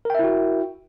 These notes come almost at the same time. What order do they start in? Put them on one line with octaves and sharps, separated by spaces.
A#4 G5 E5 E4 F#4